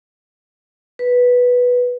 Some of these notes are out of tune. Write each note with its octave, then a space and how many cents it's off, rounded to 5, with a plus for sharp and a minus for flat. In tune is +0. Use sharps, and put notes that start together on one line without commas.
B4 -5